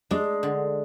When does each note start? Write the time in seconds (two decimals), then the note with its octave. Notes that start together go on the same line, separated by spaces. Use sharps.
0.11 G#3 D4
0.43 D3